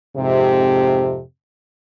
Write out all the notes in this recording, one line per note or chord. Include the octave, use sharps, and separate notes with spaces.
F2 G#2 C3